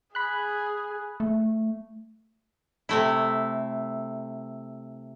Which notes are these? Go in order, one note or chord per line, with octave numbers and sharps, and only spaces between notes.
G#4 B5 F#6
A3
C3 A3 E4